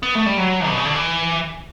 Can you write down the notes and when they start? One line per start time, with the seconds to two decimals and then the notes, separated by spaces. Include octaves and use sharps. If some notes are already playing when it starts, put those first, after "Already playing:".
0.03 B3
0.15 A3
0.26 G3
0.37 F#3
0.68 B2
0.77 C#3
0.85 D3
0.95 E3